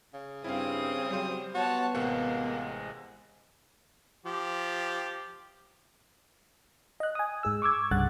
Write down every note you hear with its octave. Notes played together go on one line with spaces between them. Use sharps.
C#3
G2 C#3 C4 E4 F5 D#6
F#3 G3 C5
B3 F#4 C#5 A5
A1 C3 G#3 A#3 F#5
F3 G4
D#5 F#6
G#5 D#6
G#2 G#4 E6
C#6 D6 E6 G#6
C2 G2 C#3 F#5 F#6 A6